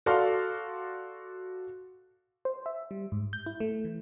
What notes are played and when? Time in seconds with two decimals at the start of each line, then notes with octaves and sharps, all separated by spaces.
0.06 F#4 A4 D5 F5 C6 F6
2.45 C5
2.66 E5
2.91 G3
3.12 G#2
3.33 G6
3.46 E4
3.60 A3
3.85 E3